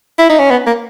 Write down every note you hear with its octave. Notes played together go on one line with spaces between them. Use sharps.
E4
D#4
C#4
B3
A#3